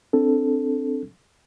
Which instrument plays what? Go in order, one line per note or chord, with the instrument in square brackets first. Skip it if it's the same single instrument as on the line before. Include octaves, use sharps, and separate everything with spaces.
[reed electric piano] C4 D4 A4